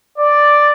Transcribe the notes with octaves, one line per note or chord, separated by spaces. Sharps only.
D5